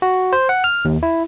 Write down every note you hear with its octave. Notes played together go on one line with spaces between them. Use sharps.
F#4
C5
F#5
F6
D#2
E4